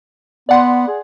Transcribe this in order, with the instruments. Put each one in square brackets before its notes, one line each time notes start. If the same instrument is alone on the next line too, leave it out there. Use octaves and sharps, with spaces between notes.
[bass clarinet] B3 [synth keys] D5 F#5 C6
[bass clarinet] G#4